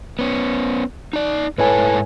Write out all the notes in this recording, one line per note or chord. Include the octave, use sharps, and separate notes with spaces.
B3 C#4
D#4 D5
G#2 E4 A4 B4 C#5 G#5